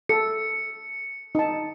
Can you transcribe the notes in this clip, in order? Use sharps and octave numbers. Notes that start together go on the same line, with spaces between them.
A4 C#7
D#4 A5